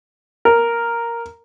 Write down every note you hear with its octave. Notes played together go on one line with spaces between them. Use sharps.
A#4